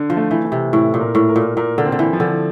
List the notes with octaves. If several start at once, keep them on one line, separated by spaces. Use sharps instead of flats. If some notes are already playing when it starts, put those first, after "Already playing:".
Already playing: D3
F3
A3
E3
A3
C3
A2 E4
A#2
A#4
A2
A#4
A#2
A#2 A#4
D3
C4
D3
E3
F3
D3